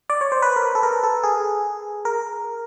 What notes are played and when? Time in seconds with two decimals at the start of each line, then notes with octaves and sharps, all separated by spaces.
0.10 D5
0.21 C#5
0.32 C5
0.42 B4
0.56 A#4
0.75 A4
0.83 A#4
1.03 A4
1.23 G#4
2.05 A#4